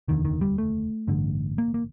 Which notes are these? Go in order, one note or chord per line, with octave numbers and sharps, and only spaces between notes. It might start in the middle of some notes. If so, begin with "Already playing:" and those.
F1 D#2 D3 D#3
D#3
G3
A3
A1 G2 D3
A#3
A#3